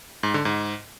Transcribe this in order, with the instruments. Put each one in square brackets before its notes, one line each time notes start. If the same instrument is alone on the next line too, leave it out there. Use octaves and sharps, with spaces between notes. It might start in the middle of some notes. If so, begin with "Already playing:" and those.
[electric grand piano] G#2
D3
G#2